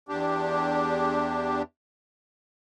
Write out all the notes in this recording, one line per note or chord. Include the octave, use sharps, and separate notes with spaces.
E2 D4 G4